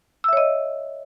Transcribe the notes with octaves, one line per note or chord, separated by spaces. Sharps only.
C#5 D#5 E5 E6